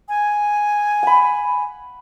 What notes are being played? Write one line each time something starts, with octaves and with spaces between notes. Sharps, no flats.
G#5
F#5 B5